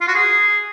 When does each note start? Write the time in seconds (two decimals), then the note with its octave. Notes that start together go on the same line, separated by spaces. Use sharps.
0.01 F4
0.08 F#4
0.15 G#4